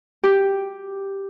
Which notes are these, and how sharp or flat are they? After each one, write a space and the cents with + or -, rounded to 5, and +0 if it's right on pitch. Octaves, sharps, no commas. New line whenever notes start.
G4 +0